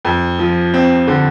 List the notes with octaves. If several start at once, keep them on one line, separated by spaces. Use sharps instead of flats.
F2
F3
C4
D3